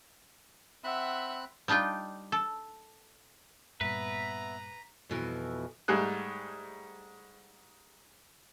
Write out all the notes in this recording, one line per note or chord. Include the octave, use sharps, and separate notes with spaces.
C4 E5 F#5 B5 F#6
G3 D4 D#4 F4 G5
A4
G2 A#2 B3 B4 E5 A#5
F2 B2 E3
G#2 G3 A3 G#4 F#6